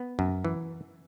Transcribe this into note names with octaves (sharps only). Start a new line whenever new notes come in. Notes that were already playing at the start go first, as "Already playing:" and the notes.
Already playing: B3
F#2
E3